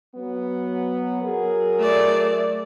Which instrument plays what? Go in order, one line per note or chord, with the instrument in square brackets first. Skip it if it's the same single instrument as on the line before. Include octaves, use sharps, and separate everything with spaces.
[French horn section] F#3 B3
F#3 G#4 A#4
[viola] A3 D5